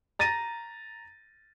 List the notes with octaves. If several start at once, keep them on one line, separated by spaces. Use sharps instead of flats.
A#5 A6 A#6 D#7